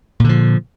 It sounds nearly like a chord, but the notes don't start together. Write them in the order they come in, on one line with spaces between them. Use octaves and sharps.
A#2 D3 F3